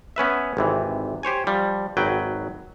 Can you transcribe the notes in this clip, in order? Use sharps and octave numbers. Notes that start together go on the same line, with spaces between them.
B3 C#4 B4 E5
G#1 C3 E3
G4 C5 C#5 G#5
F3 G3
G#1 F#3 B4 G5